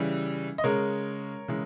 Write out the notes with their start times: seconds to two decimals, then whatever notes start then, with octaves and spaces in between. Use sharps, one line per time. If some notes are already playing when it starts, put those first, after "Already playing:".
Already playing: C#3 E3 G3
0.58 D#5
0.64 C#3 G#3 A#4 C#5
1.48 C#3 E3 G#3